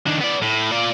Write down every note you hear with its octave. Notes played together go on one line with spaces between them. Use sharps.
D#3 D4
B3 D5
A2
F4 D5